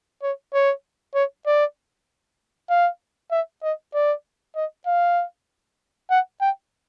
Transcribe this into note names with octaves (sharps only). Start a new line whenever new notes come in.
C#5
C#5
C#5
D5
F5
E5
D#5
D5
D#5
F5
F#5
G5